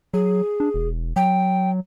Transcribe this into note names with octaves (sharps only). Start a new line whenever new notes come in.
F#3 G#4
D4
E1
F#3 G5